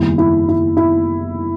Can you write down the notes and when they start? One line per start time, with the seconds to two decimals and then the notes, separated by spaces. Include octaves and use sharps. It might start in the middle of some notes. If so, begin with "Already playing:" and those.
Already playing: F#1 E2 D#3 G3 E4
0.18 E4
0.48 E4
0.77 E4